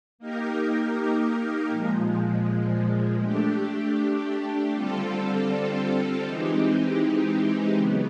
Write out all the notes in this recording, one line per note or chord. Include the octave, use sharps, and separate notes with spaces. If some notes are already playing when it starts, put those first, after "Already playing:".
A#3 D#4 G4 A#4
A#2 F3 G#3
A3 D4 G4
D3 G3 C4 F4 A4
E3 G#3 C4 D#4 G4
C#3 F#3 B3